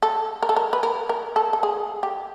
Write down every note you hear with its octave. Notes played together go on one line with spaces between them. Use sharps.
A4
A#4
A4
A#4
B4
A#4
A#4
A4
A4
G#4
G4